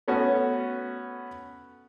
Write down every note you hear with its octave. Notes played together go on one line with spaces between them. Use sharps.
A3 B3 C#4 F#4